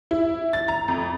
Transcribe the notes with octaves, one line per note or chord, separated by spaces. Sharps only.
E4
A6
A#5
F2